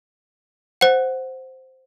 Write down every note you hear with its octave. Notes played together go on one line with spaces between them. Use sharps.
C5 F#5